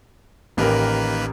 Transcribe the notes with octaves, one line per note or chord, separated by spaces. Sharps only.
A1 D#3 A#3 G4 A#4 B4